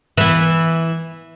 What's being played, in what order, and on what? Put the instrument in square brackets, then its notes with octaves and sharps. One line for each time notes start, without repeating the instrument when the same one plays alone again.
[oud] E3 B3